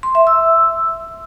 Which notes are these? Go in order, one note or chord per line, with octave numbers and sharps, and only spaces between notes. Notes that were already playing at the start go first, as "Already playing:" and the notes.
C6
E5
E6